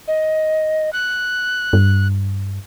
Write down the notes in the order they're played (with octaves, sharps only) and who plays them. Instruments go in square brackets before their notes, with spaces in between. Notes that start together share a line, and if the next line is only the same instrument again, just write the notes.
[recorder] D#5
F#6
[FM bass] G2